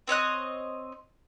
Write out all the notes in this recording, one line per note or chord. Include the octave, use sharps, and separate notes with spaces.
C4 C#5 D#5 F#6